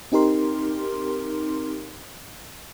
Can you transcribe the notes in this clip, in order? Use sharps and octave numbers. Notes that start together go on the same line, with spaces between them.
C4 D#4 G4 A#4 C6